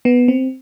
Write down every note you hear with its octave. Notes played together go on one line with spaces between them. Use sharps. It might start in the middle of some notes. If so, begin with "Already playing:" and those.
B3
C4